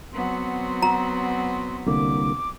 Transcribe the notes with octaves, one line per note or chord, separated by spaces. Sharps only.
F#3 B3 C4 C6
A#5
C2 D3 A#3 D6